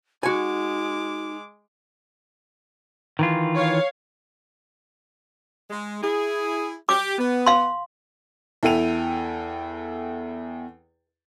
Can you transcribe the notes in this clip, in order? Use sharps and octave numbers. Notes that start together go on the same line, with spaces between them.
G#3 D#4 F#4 G#5 D6
D#3 E3 F4
C#5 F5
G#3
E4 G#4
G4 D6
B3
F5 C6
E2 E4 A4 G5 D#7 F7